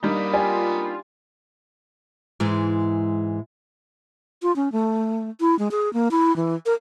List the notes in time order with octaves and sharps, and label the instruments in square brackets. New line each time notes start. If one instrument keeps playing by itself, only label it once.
[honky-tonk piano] G3 D4 D#4 [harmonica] A#3 B5 D#6
[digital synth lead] F4 [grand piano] G4 D5 G#5
[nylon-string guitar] G#2 E3 G#3
[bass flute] F4
C#4
A3
E4
G#3
G#4
A#3
E4
E3
A#4